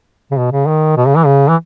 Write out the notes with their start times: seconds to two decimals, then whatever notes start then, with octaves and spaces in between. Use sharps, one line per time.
0.31 C#3
0.37 B2
0.52 C#3
0.67 D#3
0.97 B2
1.07 C#3
1.17 E3
1.26 C#3
1.48 E3